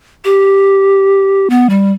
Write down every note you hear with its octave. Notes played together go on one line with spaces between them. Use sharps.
G4
B3
G3